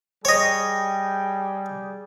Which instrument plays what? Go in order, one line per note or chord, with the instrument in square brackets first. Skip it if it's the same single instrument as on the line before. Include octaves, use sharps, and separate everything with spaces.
[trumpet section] G3 G#4 G5 [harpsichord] C#5 D#5